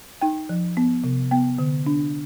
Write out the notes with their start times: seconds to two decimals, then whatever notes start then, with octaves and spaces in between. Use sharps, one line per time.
0.21 D#4 G5
0.49 F3
0.77 B3
1.04 C3
1.31 B3 G5
1.58 D3
1.86 D4